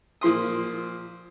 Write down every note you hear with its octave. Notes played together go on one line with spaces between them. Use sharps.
A#2 F3 C6 D#6